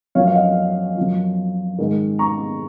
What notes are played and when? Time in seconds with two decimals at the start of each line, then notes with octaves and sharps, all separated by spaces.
0.15 F#2 F3 C#5 F5
0.27 F5
0.35 D#5 F#5
0.97 F#2 F3
1.78 G#2 D#3
2.19 A#5 C#6